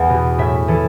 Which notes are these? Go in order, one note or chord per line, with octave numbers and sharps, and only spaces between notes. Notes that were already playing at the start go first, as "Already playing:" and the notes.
Already playing: E2 F#5
B2
A2 E5
E3 A4